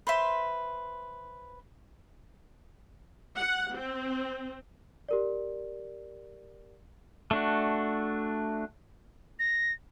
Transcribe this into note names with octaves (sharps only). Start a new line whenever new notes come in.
B4 C5 E5 C6
F#5
C4
G4 A#4 D5
A3 D4 F#4
A#6